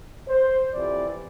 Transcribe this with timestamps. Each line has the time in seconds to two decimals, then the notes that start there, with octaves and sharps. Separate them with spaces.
0.27 C5
0.72 F2 C3 E3 D5